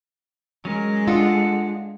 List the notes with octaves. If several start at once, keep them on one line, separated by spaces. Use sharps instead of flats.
F#3 G#3 C#4 A#4
D4 F4 A4 F#5 D#6